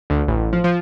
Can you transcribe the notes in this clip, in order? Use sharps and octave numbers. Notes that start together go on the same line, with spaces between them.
D2
A1
F3
F3